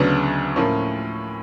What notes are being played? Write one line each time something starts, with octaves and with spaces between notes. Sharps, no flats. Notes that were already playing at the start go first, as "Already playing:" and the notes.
Already playing: D2 C#3 F#3 B3 D4 F6
A2 F3 A#3 C#4